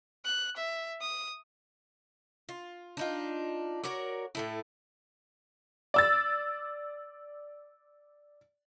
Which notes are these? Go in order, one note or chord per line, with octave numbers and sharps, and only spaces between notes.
F#6
E5
D#6
F4
D4 D#4 F4
F#4 A#4 C#5 D5
A2 A3 E4
D5 E6 A6